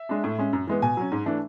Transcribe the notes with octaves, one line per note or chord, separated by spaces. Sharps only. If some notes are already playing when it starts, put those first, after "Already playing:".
Already playing: E5
G#3 D4
A2
G#3 C#4
F#2
E3 G#3 B3
B2 G#5
F#3 C#4
G#2
E3 A3 D4